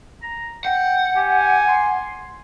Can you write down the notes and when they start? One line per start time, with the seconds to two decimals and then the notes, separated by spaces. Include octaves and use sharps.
0.22 A#5
0.65 F#5 G5
1.16 G4 G#5
1.68 C6